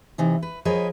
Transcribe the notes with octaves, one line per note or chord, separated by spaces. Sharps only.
C3 E3 D#4
B4
F3 G#4 A#4 B4 C#5 D#5